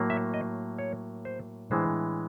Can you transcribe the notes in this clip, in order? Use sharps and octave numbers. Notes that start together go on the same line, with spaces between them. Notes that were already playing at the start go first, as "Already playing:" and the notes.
Already playing: A2 F#3 A#3
E5
D#5
C#5
C5
A2 E3 G#3 B3 D4 C5